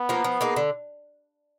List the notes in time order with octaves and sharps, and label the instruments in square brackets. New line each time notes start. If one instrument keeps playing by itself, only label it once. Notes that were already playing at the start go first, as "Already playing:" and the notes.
Already playing: [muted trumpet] B3
[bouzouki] F3 A#3
F3
A#3 D#4 G#4
D3